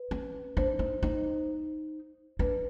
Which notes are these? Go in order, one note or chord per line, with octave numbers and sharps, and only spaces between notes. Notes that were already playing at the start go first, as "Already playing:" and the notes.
Already playing: B4
C#4
D4 C5
D#4
D#4
D4 B4